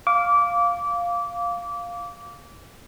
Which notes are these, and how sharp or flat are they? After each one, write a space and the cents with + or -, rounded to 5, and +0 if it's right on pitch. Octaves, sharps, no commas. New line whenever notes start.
F5 +0 D6 -25